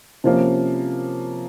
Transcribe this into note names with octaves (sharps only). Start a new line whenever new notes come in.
C3 F3 A#3 C#4